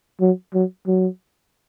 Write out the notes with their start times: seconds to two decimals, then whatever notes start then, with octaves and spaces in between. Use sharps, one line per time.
0.21 F#3
0.54 F#3
0.87 F#3